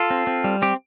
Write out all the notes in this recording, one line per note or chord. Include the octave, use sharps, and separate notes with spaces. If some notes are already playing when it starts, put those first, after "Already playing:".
Already playing: F4 A4
C4
C4
G3
C4 G4